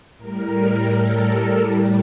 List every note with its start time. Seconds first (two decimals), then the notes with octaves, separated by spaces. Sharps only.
0.17 A2 G3 A#4
0.87 A4
1.22 A4
1.56 A2 G3